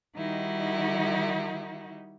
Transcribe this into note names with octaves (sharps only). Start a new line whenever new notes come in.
D#3 G3 D#4 E4 F#4